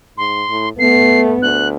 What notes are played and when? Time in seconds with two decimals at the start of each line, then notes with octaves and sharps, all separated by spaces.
0.18 G#2 C6
0.50 A2
0.79 A3 B3 C7
1.42 D2 F#6